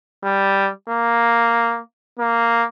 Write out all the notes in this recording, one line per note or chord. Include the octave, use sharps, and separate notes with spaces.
G3
A#3
A#3